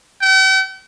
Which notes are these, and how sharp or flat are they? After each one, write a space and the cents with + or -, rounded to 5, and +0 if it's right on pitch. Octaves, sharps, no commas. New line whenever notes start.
G5 -45